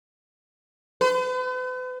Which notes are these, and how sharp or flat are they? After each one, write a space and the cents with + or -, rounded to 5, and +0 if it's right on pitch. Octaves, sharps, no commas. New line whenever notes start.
B4 +45